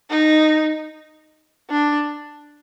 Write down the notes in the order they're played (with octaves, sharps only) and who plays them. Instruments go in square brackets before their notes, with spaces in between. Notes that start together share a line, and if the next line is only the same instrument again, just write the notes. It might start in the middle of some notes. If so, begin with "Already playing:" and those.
[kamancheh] D#4
D4